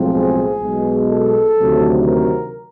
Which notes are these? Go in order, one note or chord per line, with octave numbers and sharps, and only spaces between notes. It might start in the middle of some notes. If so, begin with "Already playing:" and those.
Already playing: B1 A2 F3 G#3 C4
G#4
B1 B2 G#3
A4
D2 C3 D#3 F#3
A#4